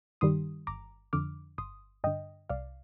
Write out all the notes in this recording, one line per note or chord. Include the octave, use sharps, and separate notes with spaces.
G2 D#3 G3 C6 D#6
G1 A#5 D6
F2 D3 D6 F6
G1 C6 D#6
G2 D3 D#5 G5
C2 D5 F5